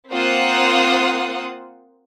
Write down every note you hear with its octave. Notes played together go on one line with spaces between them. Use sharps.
A#3 C4 F4 C5 F#5 D#6